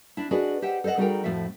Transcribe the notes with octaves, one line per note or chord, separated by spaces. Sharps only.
D4 E4
D4 F#4 G#4 B4 D5 D#5
G4 C5 D#5 E5 F#5 G5
A4 C5 D5 D#5 F#5
G3 D#4 F#4 G#4 A#4 G5
F2 A2 F3 F#4 A4 E5